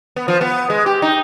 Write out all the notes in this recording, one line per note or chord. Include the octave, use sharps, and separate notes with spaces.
B3
F3
B3
G#3
G4
D#4